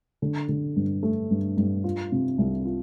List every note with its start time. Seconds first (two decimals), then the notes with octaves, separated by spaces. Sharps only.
0.22 D3
0.49 D3
0.76 G2
1.03 A3
1.31 G2
1.57 G2
1.84 F4
2.12 C3
2.38 C2
2.65 F4